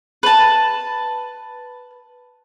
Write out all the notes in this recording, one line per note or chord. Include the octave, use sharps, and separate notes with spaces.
B4 A5